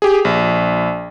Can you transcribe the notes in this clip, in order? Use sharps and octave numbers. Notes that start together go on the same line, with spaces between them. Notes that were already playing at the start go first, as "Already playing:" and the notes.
G4 G#4
A#1